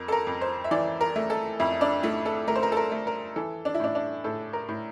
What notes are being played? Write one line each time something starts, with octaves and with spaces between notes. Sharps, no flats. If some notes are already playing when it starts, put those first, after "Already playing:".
Already playing: F2 A#4
A4
A#4
F2
C5
E5
E3 D5
A#4
A3
A4
F2 E4
D4
A3 E4
A4
A3 A#4
C5
A#4
A4
A#4
A3
A#4
E3 A4
D4
E4
A2 D4
D4
A2 A4
A#4
A2